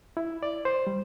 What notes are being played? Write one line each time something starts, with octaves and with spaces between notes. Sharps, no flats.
E4
D5
C5
G3